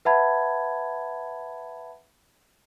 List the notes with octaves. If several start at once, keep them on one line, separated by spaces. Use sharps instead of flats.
B4 E5 F#5 A5 B5 G#6